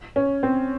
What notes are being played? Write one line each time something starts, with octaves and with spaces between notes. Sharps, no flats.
C#4
C4